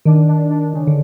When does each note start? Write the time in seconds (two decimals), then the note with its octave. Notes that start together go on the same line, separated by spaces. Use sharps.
0.05 D#3 D4
0.29 D4
0.50 D4
0.73 C#3
0.87 D3